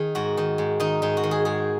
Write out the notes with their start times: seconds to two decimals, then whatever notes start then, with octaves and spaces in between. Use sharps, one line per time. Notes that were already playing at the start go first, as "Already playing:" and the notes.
Already playing: D#3 G#4
0.15 G#2 F#4
0.37 D#3
0.58 G#2
0.80 D#3 D#4
1.02 G#2 D#4
1.17 F#4
1.23 D#3
1.31 G#4
1.45 G#2 G#4